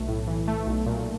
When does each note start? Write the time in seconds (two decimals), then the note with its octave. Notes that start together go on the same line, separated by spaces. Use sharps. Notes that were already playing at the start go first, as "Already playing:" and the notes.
Already playing: B1 A3
0.08 A2
0.27 E3
0.48 A3
0.67 B1
0.86 A#2